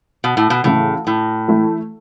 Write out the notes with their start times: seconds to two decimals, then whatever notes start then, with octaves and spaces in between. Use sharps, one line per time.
0.24 B2
0.37 A2
0.50 B2
0.64 A2 C#3 E3 A3 C#4 E4
1.07 A2
1.48 E3 A3 E4